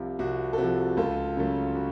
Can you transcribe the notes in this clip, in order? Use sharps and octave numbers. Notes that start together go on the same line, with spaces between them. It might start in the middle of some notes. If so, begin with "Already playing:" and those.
Already playing: C2 C3 F3 F4
C2 F#4
A4
C3 F3 F#4
C#2 F4 A4
C#3 F#3 A3
F#4